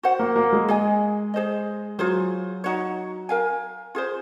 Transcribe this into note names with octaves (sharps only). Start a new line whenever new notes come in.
F#4 C5 F#5
A#3
A#3
G#3
G#4 D#5 G#5
G#4 C5 D#5
F#3 F4 G#4 C5
D#4 F#4 C#5
A#4 F5 G#5
F4 G#4 C5